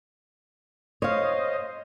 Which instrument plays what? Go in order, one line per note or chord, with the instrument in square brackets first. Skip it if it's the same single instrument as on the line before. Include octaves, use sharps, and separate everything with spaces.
[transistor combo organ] C5 D#5 [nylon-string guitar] C#5 F5